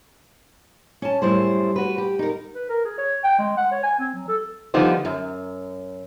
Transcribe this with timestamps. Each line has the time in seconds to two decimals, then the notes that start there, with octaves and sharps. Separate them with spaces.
1.02 C#4 A5
1.22 F#2 A2 G3 E4 G#4 C5
1.76 F#4 B4
1.98 G4
2.19 D#4 A#4
2.55 B4
2.69 A#4
2.85 G#4
2.98 C#5
3.24 G5
3.39 G#3
3.57 F#5
3.72 C#5
3.83 G#5
3.99 C4
4.14 F#3
4.28 A4
4.74 D3 F3 G3 B3 D#4 C5
5.05 F#2